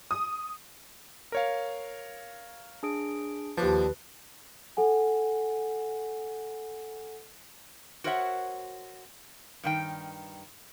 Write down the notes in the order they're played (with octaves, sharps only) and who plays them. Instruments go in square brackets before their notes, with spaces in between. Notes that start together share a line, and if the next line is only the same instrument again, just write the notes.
[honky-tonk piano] D#6
[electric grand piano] A#4 C#5 F5
[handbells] D4 G#4 D7
[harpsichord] D#2 D4 [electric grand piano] F3 [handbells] B4
[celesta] A4 F#5 G#5
[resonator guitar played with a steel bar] F#4 A#4 C5 C#5 E5 F#5
G2 D#3 G5